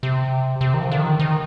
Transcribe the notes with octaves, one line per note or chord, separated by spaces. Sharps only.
C3
C3
D#3
F3
D3
D#3
D#3